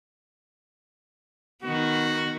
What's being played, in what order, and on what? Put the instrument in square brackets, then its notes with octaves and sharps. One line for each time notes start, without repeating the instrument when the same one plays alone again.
[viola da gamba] D#3 B3 [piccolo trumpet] F#4